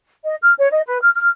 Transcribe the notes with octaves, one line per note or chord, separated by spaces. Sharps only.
D#5
F6
C#5
D#5
B4
F6
F6